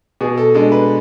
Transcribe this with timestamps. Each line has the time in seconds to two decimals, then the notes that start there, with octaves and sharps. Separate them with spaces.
0.21 B2 G#4
0.38 A4
0.55 G#3 D4 A4
0.72 B4